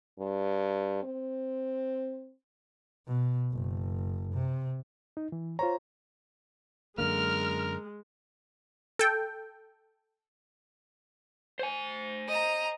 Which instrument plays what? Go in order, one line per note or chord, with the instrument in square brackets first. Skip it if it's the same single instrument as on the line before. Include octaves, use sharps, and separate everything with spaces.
[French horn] G2
C4
[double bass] B2
F#1
C3
[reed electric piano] D#4
E3
[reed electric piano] F4 C5 C#5 [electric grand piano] A#5
[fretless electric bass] F#2 D3 A#3 [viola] G#3 [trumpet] A#4 [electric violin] F6
[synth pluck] A4 G5
[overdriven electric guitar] C5 G#5
[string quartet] D#5 A#5